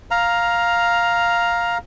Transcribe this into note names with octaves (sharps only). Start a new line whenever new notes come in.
F5 A#5